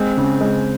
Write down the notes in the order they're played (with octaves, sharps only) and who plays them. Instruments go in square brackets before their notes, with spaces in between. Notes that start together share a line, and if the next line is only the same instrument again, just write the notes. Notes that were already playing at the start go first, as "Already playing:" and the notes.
Already playing: [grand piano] G#3 [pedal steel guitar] C4
[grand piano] C#3
G#3